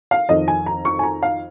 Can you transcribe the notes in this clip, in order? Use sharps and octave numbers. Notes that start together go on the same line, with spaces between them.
F5
F2 D#3 D#5
G#5
A#5
C#6
G#5
A#5
F5